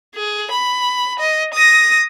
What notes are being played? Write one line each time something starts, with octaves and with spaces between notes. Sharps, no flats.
G#4
B5
D#5
D#6 A#6